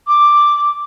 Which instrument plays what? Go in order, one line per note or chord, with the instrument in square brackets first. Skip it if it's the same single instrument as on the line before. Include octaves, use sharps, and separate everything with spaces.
[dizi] D6